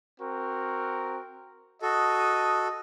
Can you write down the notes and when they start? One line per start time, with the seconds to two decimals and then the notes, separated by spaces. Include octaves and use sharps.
0.20 C4 F#4 A#4
1.82 F#4 A4 D#5 D#6